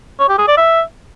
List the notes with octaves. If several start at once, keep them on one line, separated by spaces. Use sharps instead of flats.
C#5
G4
G#4
D5
E5